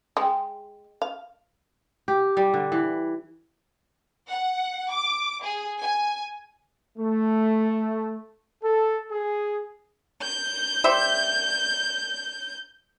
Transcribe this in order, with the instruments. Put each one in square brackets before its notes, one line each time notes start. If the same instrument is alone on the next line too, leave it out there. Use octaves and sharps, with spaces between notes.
[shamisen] G#3 [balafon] G#4 G5
[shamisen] F5
[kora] G4
G3
D3
E3
[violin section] F#5
D6
G#4
G#5
[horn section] A3
A4
G#4
[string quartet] G6
[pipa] G3 C5 E5